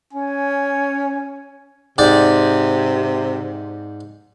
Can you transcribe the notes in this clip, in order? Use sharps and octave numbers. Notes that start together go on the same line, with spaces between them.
C#4 G#5
G#2 C3 D5 G5